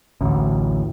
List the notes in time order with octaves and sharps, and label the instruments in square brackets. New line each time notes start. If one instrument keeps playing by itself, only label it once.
[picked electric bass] A1 D2